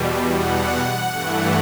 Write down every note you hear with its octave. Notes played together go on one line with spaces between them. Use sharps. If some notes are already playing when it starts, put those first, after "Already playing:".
Already playing: E2 B2 G3
F#5
G2 E3 A3